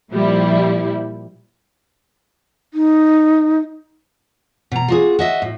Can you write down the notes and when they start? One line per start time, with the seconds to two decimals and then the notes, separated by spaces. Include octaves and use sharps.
0.11 A#2 F3 G3 E4
2.74 D#4
4.72 B2 A#5
4.88 F4 F#4 G#4
5.19 F#4 D#5 E5
5.42 A2